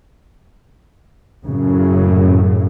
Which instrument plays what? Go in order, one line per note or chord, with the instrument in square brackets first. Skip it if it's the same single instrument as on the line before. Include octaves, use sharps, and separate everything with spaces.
[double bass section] F#2 A2 C#3